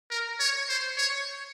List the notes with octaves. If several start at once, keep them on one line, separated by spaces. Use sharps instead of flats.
A#4
C#5
C5
C#5